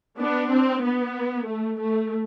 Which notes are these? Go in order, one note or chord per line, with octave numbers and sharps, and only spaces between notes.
B3 D4
C4
B3
A3
A3